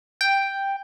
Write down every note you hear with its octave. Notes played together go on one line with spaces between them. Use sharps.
G5